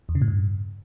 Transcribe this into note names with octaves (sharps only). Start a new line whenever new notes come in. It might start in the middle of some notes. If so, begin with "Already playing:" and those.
E2
C#3
A2
G2